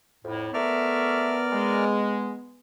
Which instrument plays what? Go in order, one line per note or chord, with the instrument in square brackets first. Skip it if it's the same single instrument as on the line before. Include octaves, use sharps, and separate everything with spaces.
[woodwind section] F2 A2
[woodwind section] A3 E5 [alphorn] B3 [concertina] A#4 D5 F6
[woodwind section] G#3